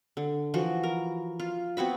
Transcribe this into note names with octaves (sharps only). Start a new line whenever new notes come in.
D3
E3 F3 F#4
A#4
F4
B3 C4 F#4 B5